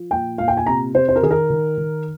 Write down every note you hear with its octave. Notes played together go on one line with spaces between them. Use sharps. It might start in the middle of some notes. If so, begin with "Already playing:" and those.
Already playing: F3
A#2 G5
A#2 F5
G5
G#5
C3 A#5
C3 C5
C5
A#4
D#3 G#4
A#4
D#3
D#3